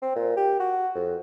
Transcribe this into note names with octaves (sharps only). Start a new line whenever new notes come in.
C4
A#2
G4
F#4
F2